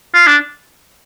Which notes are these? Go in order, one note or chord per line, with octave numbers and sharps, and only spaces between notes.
F4
D4